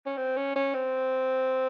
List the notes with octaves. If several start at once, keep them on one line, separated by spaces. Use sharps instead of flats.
C#4
C4
C#4
C#4
C4